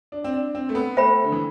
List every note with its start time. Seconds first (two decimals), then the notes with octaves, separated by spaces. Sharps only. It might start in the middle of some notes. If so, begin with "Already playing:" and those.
0.12 D4
0.24 C4
0.33 D4
0.55 C4
0.69 A3
0.75 B3
0.97 A3 C5 E5 G5 B5
1.24 D3
1.32 E3